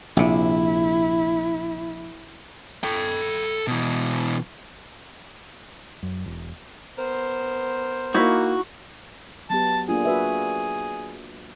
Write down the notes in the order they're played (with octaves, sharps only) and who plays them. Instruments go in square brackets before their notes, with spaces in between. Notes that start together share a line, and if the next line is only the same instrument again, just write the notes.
[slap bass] A#1 C3 [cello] E4
[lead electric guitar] A4 G5
B2 E3
[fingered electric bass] F#2
E1
[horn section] B3 A#4 C5
[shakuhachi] A#3 [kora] D#4 E4 [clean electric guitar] F#4
[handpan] F#3 B3 G4 [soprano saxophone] A5
[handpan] A#3 D4 F4 [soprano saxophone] G#4
[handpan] F#4 B4 E5